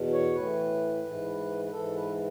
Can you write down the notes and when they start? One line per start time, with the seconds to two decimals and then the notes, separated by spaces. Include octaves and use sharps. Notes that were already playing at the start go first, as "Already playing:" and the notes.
Already playing: E2 B2
0.13 C#5
0.35 A2 E3 B4
1.04 G#2 E3
1.65 B4
1.71 G#2 E3 A4
1.95 B4